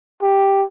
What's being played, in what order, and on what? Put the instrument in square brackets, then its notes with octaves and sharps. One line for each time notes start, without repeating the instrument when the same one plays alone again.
[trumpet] G4